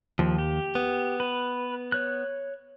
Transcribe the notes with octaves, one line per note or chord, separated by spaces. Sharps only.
D#2 F3
G4
B3
B4
C#5 F#6